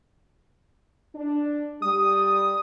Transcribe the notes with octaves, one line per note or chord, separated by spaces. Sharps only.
D4
G3 D#6